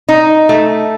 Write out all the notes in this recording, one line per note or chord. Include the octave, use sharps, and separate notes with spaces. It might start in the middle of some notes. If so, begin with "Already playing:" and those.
D#4
A3